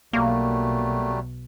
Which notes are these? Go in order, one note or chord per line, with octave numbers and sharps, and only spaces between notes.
B1 F#3 G3 A3 A#3